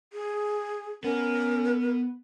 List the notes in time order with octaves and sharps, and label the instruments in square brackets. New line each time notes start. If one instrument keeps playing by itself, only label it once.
[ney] G#4
[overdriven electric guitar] B3 [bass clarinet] C#4 [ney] A#4